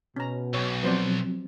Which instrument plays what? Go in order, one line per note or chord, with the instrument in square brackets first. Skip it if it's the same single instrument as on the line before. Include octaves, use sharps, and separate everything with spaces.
[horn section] B2 [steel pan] C#4 A#5
[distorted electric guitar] B1 [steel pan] C#5
[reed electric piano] F3 F#3 C4 [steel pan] B3 C5 D5